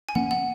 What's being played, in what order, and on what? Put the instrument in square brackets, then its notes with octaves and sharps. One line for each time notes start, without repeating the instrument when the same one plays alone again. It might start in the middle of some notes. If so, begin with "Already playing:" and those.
[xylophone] G#5
[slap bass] F3 A#3 C#4 [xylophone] F#5
[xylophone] F#5